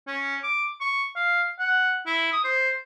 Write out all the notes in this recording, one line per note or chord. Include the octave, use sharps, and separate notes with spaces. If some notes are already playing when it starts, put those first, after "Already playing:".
C#4
D6
C#6
F5
F#5
E4
D#6
C5